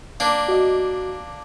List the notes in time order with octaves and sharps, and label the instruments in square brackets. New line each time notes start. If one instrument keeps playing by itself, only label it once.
[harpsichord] A#3 D4
[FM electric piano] F#4 D#5